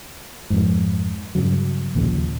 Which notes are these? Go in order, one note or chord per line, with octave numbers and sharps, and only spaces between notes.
F2 G#2
G2 C#3 F#3
A#1 D#2 A#2 C#3